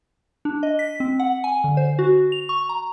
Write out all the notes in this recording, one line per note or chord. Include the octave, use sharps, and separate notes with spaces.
D4
D#5
B6
C4
F#5
G#5
D3
C5
F#4
F7
C#6
A#5